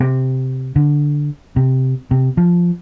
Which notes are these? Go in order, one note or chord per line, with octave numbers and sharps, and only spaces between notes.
C3
D3
C3
C3
F3